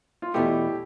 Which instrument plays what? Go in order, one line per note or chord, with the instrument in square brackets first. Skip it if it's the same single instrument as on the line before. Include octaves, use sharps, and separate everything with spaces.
[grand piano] F4
[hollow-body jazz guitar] E2 B2 A3 [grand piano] E4 G4